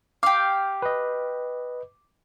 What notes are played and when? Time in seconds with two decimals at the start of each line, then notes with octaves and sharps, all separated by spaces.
0.23 G4 F5 D6
0.82 B4 D#5